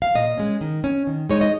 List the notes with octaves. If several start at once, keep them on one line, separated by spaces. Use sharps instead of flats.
F5
A#2 D#5
G#3 C#4
D#3
C#4
D#3
G#3 D#4 C#5
D#5